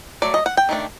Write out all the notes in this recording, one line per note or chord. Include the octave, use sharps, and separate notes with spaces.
F#3 A3 D5
D#5
F#5
G5
D#3 A3 D4